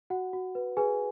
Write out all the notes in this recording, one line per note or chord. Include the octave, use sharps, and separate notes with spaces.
F#4 F#5
F#4
B4
G#4 B4 G#5